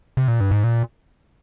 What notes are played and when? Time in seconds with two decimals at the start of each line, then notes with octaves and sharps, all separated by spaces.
0.17 C3
0.28 A#2
0.40 G2
0.51 G#2
0.64 A#2